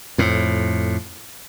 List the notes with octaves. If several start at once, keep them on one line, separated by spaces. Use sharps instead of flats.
F2 A2